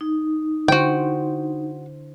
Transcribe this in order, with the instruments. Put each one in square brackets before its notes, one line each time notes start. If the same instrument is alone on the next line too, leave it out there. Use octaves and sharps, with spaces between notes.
[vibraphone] D#4
[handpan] D3 E4 C5 [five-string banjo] F#4 G5